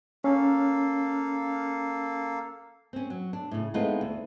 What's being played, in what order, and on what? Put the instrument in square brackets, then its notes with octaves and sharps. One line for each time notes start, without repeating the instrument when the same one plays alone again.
[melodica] A#3 A4 F5 [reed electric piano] C#4
[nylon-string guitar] C4 C#4
F#3
D4
A2 C#3
G#3 A3 B3 C4 D#4 F4
D2